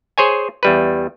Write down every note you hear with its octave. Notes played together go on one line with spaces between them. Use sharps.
G#4 C5 C#5 G#5
E2 G3 B4